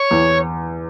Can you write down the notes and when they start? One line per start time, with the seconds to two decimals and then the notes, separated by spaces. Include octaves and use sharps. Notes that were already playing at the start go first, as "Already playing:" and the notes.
Already playing: C#5
0.11 E2